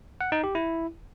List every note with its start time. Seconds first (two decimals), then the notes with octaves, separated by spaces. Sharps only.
0.21 F#5
0.32 D#4
0.44 G4
0.55 E4